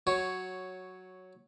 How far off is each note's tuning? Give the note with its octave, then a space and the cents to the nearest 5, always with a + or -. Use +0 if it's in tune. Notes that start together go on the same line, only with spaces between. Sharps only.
F#3 +0 C#5 +0